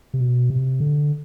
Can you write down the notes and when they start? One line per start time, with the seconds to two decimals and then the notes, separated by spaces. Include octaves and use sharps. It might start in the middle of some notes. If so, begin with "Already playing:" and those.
0.14 C3
0.20 B2
0.50 C3
0.80 D3